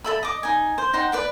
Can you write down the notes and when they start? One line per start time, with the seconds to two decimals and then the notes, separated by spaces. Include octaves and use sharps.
0.04 A4 E5 B5
0.23 D#5 D6
0.43 D#4 G#5
0.78 C5
0.93 D#4 C5 F#5 G5
1.12 B4 D5 B5